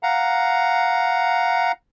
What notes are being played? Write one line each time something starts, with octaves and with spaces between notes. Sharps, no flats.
F5 F#5 A#5